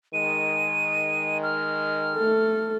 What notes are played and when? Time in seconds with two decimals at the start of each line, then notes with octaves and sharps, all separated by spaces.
0.13 D#3 G#3 D#7
1.43 F6
2.15 A3 A4